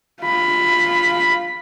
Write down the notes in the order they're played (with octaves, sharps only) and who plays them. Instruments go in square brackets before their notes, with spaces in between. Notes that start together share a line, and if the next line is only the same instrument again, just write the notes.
[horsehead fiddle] F4 B5